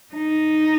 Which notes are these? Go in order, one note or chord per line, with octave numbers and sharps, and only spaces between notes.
D#4